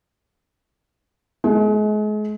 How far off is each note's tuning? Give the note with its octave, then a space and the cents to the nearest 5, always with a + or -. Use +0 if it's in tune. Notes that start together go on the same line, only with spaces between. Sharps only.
G#3 +35